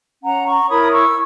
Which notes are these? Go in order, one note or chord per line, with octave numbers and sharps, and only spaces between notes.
C#4 F#5 A#5
A#5 C#6
E4 A#4 C#5 B5 D#6
C#6 E6